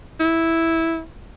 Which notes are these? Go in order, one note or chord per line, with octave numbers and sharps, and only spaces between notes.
E4